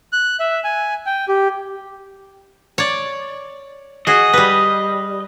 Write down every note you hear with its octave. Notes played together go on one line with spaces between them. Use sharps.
F#6
E5
G#5
G5
G4
C#5 D5
F#4 G#4 D#5
G3 B4